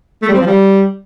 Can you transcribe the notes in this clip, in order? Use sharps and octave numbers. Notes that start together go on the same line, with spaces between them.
A3
G3
C4
F3
G3